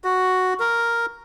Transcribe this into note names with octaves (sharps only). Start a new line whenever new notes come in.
F#4
A#4